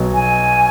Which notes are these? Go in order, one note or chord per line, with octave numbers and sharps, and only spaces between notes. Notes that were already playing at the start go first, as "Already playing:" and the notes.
Already playing: B1 B2 F#3
G#5